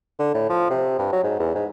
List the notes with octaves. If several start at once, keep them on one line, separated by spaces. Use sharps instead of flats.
D3
A2
F3
C3
G2
F#3
G#2
E2
G#2